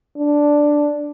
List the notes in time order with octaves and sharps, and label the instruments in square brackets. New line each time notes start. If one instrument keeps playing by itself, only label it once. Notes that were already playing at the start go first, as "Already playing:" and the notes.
[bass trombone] D4